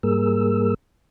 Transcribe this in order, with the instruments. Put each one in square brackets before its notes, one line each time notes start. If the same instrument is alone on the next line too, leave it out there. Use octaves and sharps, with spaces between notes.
[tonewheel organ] G#2 G3 A#3 G#4 A#4 E6